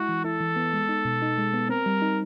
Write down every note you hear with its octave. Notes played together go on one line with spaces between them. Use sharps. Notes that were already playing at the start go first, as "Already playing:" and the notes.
Already playing: G#3 E4 F#4
E3
E4 A4
E3
B3
G#3
D#4
B2
D#4
G#3
B3
C4 A#4
G3
D#4